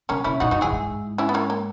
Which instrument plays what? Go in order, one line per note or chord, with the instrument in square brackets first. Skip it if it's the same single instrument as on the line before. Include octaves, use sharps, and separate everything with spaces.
[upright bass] C#3 [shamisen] A#3 C#4
[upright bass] C#3 [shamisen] C#4 E4
[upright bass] A#2 [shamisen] D#4 F#4
[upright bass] F#2 [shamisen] D#4 F#4
[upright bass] E2 [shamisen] E4 G#4
[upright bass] G#2
[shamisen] C#4 E4
B3
A#3 C#4
A#3